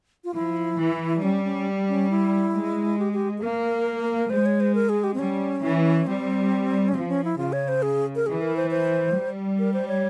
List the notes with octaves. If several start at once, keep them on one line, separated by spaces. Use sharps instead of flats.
F4
F3 E4
E3
G3 C#4
C#4
C#4
E4
G#3
G4
G4
G#4
A#3 A#4
G#3 C5
C#5
C5
A#4
G#4
G4
C4
G3 C#4
E3
G3 C4
C#4
F3 C4
C#4
E4
C#3 F4
C#5
C5
G#4
A#4
E3 G#4
A#4
C5
C5
G3
A#4
C5
C#5